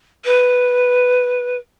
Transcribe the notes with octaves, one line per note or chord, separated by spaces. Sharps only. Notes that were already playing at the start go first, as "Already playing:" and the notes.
B4